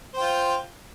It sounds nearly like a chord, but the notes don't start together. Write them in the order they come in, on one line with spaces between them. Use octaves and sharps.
C5 G5 F4